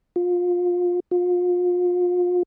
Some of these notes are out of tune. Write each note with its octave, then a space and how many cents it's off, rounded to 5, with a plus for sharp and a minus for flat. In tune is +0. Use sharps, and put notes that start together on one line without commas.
F4 +25
F4 +35